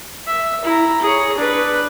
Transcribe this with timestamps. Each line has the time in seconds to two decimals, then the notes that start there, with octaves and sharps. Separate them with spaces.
0.27 E5
0.65 E4 A#5
1.02 G#4 C#5
1.38 D4 B4